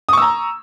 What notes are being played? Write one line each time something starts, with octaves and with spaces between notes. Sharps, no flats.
A#5 C#6 D#6 E6